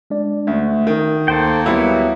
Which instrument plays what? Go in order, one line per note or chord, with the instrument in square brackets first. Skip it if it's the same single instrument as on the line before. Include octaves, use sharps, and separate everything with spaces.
[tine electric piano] G#3 D4 D5
[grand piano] D2 [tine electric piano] E5
[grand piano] D#3
[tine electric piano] D2 [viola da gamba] A#3 [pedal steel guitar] A4 C5 G5
[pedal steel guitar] F#3 G3 B3 [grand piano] E4